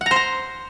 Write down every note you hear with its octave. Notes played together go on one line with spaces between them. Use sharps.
F#5
A#5
C5
A#5